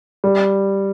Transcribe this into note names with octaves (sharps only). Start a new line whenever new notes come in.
G3